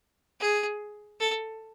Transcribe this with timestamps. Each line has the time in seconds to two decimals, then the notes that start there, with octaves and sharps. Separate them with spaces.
0.40 G#4
1.20 A4